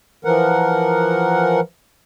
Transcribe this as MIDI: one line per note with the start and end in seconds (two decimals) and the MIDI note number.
0.25 1.60 52
0.25 1.60 53
0.25 1.60 70
0.25 1.60 78